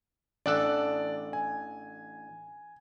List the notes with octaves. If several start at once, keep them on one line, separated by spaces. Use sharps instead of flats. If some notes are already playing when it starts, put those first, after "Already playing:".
A1 D4 A4 D5 F#6
G#5